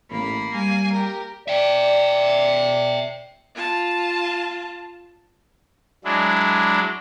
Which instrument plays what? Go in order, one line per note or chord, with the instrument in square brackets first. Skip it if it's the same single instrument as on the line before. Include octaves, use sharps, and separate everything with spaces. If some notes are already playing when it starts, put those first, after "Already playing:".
[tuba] A1 [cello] A#3 [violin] B5
[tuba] G3 [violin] G#5
[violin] G4 A#4
[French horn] D5 [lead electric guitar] E5 G5
[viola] F4 A5
[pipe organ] F#3 G#3 D4 E4